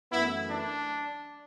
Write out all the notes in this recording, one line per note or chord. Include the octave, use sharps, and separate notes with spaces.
F#2 E3 A3 B3 E4
D4